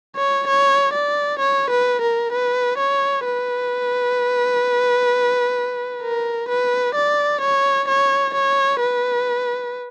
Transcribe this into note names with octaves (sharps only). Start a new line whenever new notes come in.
C#5
C#5
D5
C#5
B4
A#4
B4
C#5
B4
A#4
B4
D5
C#5
C#5
C#5
B4